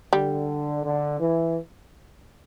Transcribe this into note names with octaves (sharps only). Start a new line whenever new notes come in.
D3 G3
D3
E3